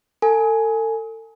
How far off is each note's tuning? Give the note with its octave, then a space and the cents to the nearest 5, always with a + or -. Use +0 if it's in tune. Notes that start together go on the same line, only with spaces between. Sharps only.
A4 +35 G#5 +10